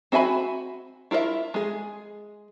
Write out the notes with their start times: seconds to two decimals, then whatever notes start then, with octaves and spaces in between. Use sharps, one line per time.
0.12 C4 F#4 E5 G#5 B5
1.11 E4 F4 A#4 D5 E5
1.54 G#3 G#4